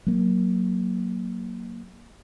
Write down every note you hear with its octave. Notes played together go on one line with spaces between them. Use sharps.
F#3 A#3